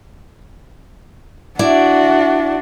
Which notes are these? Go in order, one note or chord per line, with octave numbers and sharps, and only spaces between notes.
D4 E4 F#4 D5